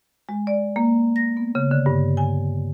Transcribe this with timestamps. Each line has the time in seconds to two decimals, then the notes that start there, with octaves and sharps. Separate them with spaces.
0.29 G#3
0.47 D5
0.76 A#3
1.16 A#6
1.37 B3
1.55 C#3
1.71 D3
1.86 G2
2.17 G#5